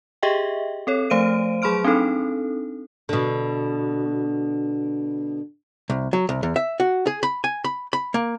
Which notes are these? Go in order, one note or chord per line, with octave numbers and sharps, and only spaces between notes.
G4 G#4 D#5 E5 G5
C4 A4 C#5
F3 A3 C5 F5 D7 D#7
F#3 G#4 B5 C6 F6 D7
C4 D4 D#4 A4
B2 D3
C2
F#3
C2
E2
E5
F#4
G#4
B5
G#5
B5
B5
A#3